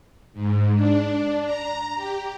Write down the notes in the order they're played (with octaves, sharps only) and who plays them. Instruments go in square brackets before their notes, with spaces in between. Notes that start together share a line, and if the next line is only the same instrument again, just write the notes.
[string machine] G#2
D4
A#5
G4